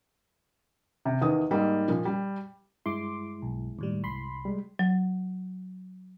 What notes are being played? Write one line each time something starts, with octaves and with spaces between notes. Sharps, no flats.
C3
E2 D#3 D#6
G#2 G3 A#3
A#2 F3
G3
G2 G#3 E4 C6 D6
B1
D#2 A2 G3
C2 B5 C6
G3 G#3
F#3